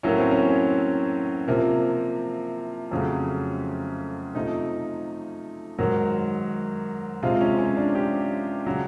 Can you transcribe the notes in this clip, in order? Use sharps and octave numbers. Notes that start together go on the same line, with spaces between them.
A2 F#3 A#3 C#4
C4
C#4
C3 F3 A#3
F2 C#3 F#3 A3
C3 F3 A3 D#4
G#2 D#3 F#3
C3 F3 G#3 F4
C#4
C#4
D4
G4
C#3 F#3